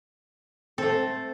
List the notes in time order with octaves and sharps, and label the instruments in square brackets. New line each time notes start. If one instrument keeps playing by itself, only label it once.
[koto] A3 A4 [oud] C4